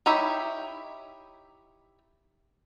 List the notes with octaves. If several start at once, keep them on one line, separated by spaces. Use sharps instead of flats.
D#4 E4 G4 C#5 E5